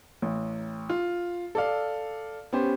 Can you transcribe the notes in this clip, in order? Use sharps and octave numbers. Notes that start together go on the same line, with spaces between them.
A1
F4
A4 D5 F5
B3 C#4 G4 C5